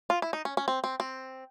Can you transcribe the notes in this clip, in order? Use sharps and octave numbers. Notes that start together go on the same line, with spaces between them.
F4
E4
D#4
C#4
C#4
C4
C4
C4